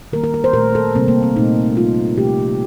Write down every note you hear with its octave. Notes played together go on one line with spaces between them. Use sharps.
D#3 G3 A#3 A#4
A#4
A#4
C5
A#2 A3 A#4
A4
C3 G3 A#3 C4
A#3
C4
A#2 A3 D#4
C3 G3 A#3 F4
C3 F3 A3 G4